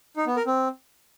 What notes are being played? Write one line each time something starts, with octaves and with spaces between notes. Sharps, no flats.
D#4
B3
A#4
C4